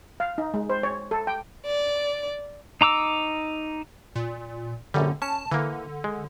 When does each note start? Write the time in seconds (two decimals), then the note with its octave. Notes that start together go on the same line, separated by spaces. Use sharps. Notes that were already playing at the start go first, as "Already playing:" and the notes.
0.20 F5
0.38 D#4
0.54 G#3
0.70 C5
0.83 C#5
1.11 A4
1.27 G5
1.66 D5
2.81 D#4 A#5 D6 E6
4.16 A#2
4.94 A#1 F#2 D3 G3
5.22 C#4 A5
5.51 D3 E3 A#3
6.04 G#3